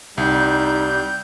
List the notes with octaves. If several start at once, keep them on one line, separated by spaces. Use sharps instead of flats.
C2 G3 D#4 G6